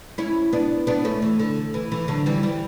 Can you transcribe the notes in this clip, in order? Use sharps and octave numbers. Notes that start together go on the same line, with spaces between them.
C#4 E4
B3 D4
B3 D4
A3 C#4
E3
D3
E3
E3
D3 F#3
E3 G3
E3 G3